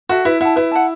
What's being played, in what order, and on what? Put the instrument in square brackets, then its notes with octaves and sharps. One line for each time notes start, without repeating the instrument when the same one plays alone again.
[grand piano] F#4 [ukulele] A4 E5
[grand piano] E4 [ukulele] B4
[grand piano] E4 [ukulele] F#5 A5
[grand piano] E4 [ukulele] B4
[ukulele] F#5 A5